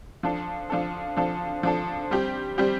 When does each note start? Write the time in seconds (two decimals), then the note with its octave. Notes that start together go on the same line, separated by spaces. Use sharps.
0.23 F3 D4 A4
0.70 F3 D4 A4
1.17 F3 D4 A4
1.63 F3 D4 A4
2.11 G3 C4 G4
2.58 G3 C4 G4